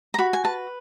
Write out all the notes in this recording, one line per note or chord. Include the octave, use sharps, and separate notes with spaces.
A#5
F#4 B5
G#5
B4 A5